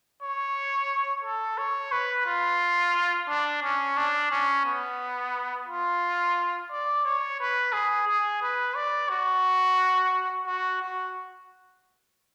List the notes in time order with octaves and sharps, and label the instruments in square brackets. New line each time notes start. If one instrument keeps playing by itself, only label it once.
[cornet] C#5
A4
C#5
B4
F4
D4
C#4
D4
C#4
B3
F4
D5
C#5
B4
G#4
G#4
B4
D5
F#4
F#4
F#4